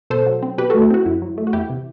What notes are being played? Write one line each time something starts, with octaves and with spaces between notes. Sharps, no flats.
B2 A4 C5
F#3
C4
B2 G4 B4
A3 F#4 A4
E4
C4 F#4
F#2 E4
F#3
A3
F#4
E2 E4 G4
C3